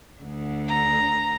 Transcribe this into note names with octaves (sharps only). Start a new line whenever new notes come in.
D2 D3
A#5